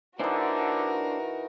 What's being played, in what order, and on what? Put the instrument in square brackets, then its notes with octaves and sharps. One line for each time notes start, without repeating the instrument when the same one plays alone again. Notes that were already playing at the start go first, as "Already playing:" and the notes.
[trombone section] D3 [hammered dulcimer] E3 D#4 [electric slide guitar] D4 C5 [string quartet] F#4 A#4